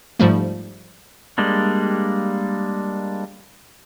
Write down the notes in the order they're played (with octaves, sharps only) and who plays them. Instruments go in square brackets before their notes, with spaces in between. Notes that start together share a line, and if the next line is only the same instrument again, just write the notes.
[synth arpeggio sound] G#2 F3 G3 A3
[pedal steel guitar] G3 G#3 A#3 D4